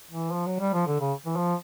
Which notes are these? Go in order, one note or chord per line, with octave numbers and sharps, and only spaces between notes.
E3
F3
F#3
G3
F3
D3
C#3
E3
F3